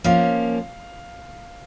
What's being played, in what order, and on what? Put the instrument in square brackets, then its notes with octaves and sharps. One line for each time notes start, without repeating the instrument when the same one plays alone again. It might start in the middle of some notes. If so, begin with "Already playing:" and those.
[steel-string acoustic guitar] F3 A#3 C#4 [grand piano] F5